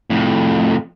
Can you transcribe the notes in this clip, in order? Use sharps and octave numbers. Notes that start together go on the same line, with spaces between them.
F2 A2